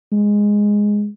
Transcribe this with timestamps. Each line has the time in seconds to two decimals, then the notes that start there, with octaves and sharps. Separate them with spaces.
0.12 G#3